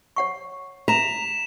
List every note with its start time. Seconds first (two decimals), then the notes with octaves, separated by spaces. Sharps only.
0.16 C#5 F#5 C#6
0.88 A#5 B6 E7 F7